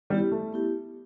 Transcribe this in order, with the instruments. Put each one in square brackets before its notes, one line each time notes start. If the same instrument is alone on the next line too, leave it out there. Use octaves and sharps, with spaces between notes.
[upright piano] G3 [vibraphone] B3 E4 G4
[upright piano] A3
[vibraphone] B3 E4 G4